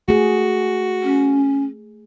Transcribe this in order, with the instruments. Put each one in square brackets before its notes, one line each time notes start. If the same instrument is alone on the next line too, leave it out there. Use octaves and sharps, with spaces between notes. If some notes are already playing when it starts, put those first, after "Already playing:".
[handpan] A3 G#4 [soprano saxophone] F#4
[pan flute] C#4